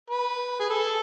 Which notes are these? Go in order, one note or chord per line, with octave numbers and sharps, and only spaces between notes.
B4
G#4
A4